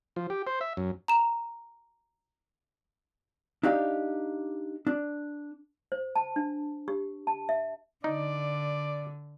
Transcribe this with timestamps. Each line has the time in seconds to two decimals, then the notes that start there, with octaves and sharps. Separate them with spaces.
0.16 F3
0.30 G4
0.47 C5
0.61 E5
0.77 F#2
1.08 A#5 E7
3.63 D4 D#4 G4 F5
4.87 D4
5.92 C5
6.16 A5
6.36 D4
6.88 G4
7.27 A5
7.49 E5
8.04 D3 D#4 D5